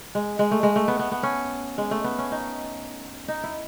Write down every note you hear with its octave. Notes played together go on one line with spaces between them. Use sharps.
G#3
G#3
A3
G#3
A3
B3
B3
B3
C#4
G#3
A3
B3
C#4
D#4
D#4
E4